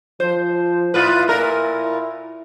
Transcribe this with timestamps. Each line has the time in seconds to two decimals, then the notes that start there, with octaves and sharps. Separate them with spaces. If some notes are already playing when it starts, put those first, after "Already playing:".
0.20 F3 C5
0.94 A2 E4 F4 B4
1.28 A#2 A#4 E5